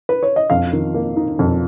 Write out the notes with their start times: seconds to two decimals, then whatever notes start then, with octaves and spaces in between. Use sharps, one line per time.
0.09 B4
0.23 C#5
0.36 D#5
0.50 F2 F5
0.73 D#3
0.94 A#3
1.17 D#4
1.39 F2